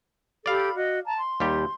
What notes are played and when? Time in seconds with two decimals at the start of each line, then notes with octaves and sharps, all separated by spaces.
0.46 G4 A4 D5 F5 B5
0.75 F#4 D#5
1.04 A5 A#5
1.18 C6
1.40 D#2 G3 G4